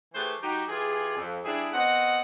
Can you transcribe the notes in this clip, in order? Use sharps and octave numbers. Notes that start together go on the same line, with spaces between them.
E3 A3 G4 G#4 B4 C5
G3 D#4 F#4 G4
E3 F4 G4 G#4
F2
G3 D4 E4 G#4
B3 C4 D#5 F#5